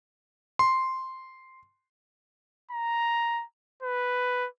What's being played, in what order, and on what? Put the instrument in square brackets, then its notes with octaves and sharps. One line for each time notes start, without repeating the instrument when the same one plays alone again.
[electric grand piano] C6
[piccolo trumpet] A#5
B4